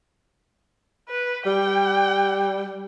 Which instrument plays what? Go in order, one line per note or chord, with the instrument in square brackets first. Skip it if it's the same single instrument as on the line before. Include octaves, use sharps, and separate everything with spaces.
[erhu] B4
[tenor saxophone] G3 [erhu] G5